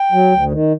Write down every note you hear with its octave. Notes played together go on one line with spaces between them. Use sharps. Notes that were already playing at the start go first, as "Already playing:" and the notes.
Already playing: G5
F#3
D2
D#3